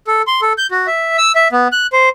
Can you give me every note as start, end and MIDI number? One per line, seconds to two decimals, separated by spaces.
0.07 0.22 69
0.27 0.41 84
0.42 0.53 69
0.58 0.67 91
0.71 0.87 66
0.87 1.17 76
1.18 1.32 88
1.35 1.48 76
1.52 1.68 59
1.72 1.87 90
1.93 2.09 72